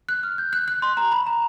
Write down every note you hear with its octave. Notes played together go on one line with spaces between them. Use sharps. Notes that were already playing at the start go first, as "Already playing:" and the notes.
F#6
F6
G6
F#6
F#6
C6
A#5
B5
A#5